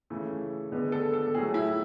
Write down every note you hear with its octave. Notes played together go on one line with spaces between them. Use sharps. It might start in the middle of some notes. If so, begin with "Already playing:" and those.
C#3 E3 A3
D3 G#3 B3
A4
A4
A2 F#3 A3 G#4
E4